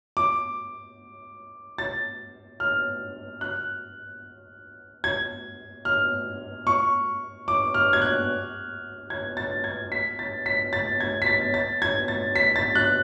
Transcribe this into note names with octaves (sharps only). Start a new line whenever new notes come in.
D6
A6
F6
F#6
G#6
F6
C#6
D6
F6
G#6
F#6
G#6
A6
G#6
B6
A6
B6
A6
G#6
B6
A6
A6
G#6
A6
B6
A6
F#6